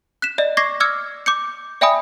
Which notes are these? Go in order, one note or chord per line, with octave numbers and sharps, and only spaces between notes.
F#6 B6 E7
D5 D#5
C#6 D6 G#6 A#6 C7
D6 E6 F6 G#6 C#7
D6 G6 C#7
D5 E5 G5 G#5 B5 D#6